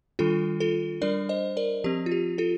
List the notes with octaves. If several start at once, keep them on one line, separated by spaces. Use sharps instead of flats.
D#3 G3 D4 F4 A4
F4 A4
G3 D4 A#4 D5
C5 D#5
A#4 D5
F3 C4 G4
F4
G4
F4 A4